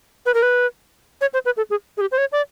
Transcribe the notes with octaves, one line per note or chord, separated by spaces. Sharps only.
B4
A#4
B4
C#5
C5
B4
A4
G#4
G#4
G4
C5
C#5
D5